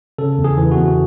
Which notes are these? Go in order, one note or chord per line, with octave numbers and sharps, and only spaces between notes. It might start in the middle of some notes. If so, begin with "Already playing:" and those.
C#3 A4
E2
G#4
E3
F#4
E2